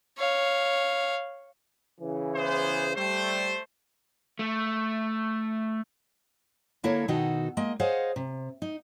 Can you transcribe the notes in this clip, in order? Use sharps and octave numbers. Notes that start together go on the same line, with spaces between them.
C#5 F5
C#3 E3
B3 G#4 C5
G3 A3 C5
A3
D3 A#3 E4 A4 A#4 C#5
B2 D#3 D#4 F#4 A4
G#3 A#3 D#5
G#4 C5 C#5 D#5 F5 F#5
C3
D#4